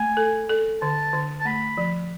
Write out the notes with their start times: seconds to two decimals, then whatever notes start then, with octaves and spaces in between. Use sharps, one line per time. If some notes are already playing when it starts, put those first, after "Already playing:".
Already playing: A3 G#5
0.17 A4
0.49 A4
0.81 D3 A5
1.13 D3
1.40 A5
1.45 A3 B5
1.78 F3